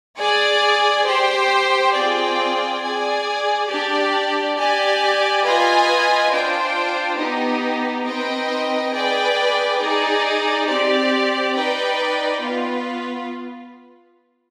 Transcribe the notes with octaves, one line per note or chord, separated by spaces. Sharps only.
G#4 D5 G#5
G4 C5 G5
C4 F4 G#4 D5 G5
G#4 D5 G#5
D4 G4 D5
G4 D5 G#5
F4 B4 D#5 G#5
D4 F4 C5 G5
B3 D#4 G4
C4 D#4 B4 D#5 G5
G#4 B4 D5 G5
D#4 G#4 D5
C4 G4 D5
D#4 B4 D5 G5
B3 F4 B4